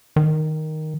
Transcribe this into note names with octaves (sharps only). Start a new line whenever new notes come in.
D#3